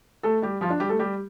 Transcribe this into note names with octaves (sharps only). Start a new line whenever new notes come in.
A3 A4
G3 G4
F3 F4
D4
G3 G4
A3 A4
G3 G4